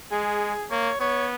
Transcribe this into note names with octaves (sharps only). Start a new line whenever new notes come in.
G#3 G#4
A#3 C#5
B3 C#5